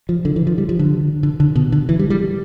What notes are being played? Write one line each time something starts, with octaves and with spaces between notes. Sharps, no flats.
F3
D3
E3
F3
G3
F3
D3
D3
D3
B2
D3
E3
G3
G3